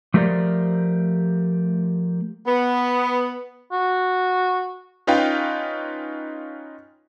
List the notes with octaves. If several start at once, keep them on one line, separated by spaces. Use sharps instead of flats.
F3 A3 G4 A#4 C5 D5
B3
F#4
C#4 D#4 F4 B4 F5 G5